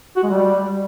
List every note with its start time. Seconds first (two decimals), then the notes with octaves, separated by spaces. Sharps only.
0.16 F#4
0.23 G#3
0.30 G3